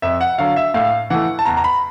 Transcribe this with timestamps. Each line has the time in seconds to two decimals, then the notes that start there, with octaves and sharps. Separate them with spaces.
0.02 F2 E5
0.21 F#5
0.38 D3 F#3 F5
0.56 E5
0.74 A2 F5
1.10 E3 A3 F#5
1.39 A5
1.45 E2 A#5
1.57 A#5
1.64 B5